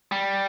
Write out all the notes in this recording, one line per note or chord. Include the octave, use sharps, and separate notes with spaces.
G3